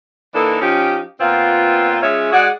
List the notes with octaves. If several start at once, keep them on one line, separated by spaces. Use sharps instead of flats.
E3 A#3 D4 D#4 A4
F3 C#4 D#4 G4
A#2 B3 C4 F4
G#3 C#4 F4 G#4 C#5 E5
G#3 F#4 G#4 D5 F#5